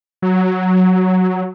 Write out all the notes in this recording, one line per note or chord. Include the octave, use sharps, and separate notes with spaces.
F#3